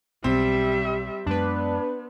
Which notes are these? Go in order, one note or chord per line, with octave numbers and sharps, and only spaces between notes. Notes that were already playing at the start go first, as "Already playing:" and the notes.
B1 B2 G3 C4 E5
F#2 G#3 B3 D4 B4